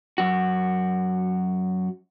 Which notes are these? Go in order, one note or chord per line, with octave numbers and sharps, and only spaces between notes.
F#2 F#4